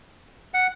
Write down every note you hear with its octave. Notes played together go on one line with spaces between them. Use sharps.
F#5